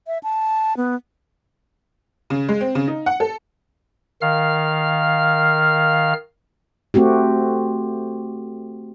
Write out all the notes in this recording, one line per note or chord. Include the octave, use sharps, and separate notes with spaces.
E5
A5
B3
C#3
G#3
C4
C#3
D#4
F#5
A4
D#3 F5 F6
A3 C4 F#4 G4